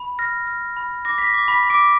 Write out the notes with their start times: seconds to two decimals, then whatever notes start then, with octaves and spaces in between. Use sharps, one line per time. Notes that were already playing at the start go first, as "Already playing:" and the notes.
Already playing: B5
0.19 F6 A#6
0.47 F6
0.77 B5
1.05 D6 A#6
1.18 B6
1.27 A#6
1.34 D6
1.48 B5 B6
1.63 B5
1.70 D6 D7